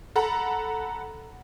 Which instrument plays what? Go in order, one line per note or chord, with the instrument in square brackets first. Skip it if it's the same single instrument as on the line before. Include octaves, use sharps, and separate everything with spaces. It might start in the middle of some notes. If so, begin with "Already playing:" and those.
[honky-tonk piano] A4 F#5 A#5 B5